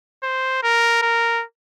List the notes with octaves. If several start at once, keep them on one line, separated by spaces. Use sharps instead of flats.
C5
A#4
A#4